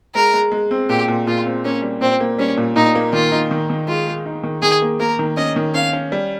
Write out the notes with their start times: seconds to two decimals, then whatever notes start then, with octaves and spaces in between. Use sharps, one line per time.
0.15 G#3 A#4
0.34 G#3
0.52 G#3
0.71 C4
0.89 A#2 G4
1.08 A#2
1.27 A#2 F4
1.45 C4
1.65 A#3 C#4
1.82 G3
2.01 A#2 C4
2.20 A#3
2.38 G3 C#4
2.57 A#2
2.76 A#2 D#4
2.95 A#3
3.13 D#3 F4
3.32 D#4
3.51 D#3
3.70 D#3
3.87 G#3 F4
4.07 G#3
4.26 D#4
4.43 D#3
4.62 D#3 G#4
4.82 A#3
5.00 A#3 A#4
5.19 D#3
5.37 C#4 D#5
5.56 D#3
5.74 C#4 F5
5.93 C#4
6.12 G3